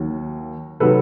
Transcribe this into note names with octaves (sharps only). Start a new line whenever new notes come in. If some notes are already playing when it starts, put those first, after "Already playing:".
Already playing: D#2 D#3 F#3
C3 D#3 F#3 A4 B4